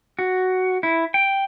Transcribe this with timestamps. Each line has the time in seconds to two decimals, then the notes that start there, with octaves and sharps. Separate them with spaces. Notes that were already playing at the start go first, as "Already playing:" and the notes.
0.19 F#4
0.83 E4
1.14 G5